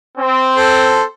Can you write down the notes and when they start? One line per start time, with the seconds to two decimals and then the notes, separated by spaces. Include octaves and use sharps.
0.17 C4
0.57 A4 C5